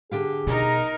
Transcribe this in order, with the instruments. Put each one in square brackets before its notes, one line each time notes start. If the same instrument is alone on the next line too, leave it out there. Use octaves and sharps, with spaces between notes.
[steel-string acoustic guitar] D3 G4 F5 [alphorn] G#4
[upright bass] B2 [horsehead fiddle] D#4 A#4